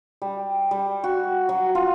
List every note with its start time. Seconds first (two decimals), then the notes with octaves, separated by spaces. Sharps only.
0.22 G3
0.71 G3
1.04 F#4
1.49 F#3
1.75 F4